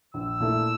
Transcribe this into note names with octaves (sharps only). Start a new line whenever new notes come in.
A#1 E6
A#2 A3 E4 A4